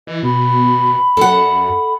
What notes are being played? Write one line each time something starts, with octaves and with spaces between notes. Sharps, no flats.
E3 D#5
B2 B5
F#2 A4 F#5